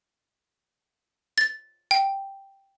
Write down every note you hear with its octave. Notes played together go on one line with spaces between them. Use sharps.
A6
G5